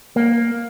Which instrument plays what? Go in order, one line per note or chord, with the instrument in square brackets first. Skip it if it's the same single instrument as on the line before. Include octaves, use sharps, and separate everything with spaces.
[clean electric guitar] A#3